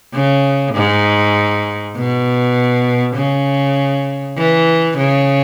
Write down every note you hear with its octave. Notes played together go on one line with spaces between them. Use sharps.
C#3
G#2
B2
C#3
E3
C#3